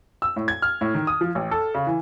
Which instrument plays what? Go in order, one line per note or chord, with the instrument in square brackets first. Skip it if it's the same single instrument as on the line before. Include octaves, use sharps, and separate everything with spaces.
[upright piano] E6
A2
G#6
F6
A2
D#3
D#6
F3
A1
A4
C#3
E3